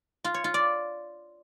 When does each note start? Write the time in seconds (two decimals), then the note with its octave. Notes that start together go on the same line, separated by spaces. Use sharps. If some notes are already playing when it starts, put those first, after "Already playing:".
0.24 F4
0.34 C#5
0.44 F4
0.54 D5